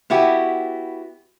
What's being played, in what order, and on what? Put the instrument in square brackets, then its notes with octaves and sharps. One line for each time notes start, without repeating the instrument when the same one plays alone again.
[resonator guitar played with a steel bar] B3 E4 F#4 G4